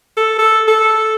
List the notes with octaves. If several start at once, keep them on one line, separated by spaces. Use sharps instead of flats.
A4
A4
A4